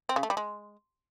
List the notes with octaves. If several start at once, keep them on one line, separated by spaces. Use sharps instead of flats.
C4
C#3
A3
G3
G#3